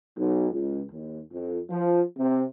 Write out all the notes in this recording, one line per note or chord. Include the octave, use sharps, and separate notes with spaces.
B1
C#2
D#2
F2
F3
C3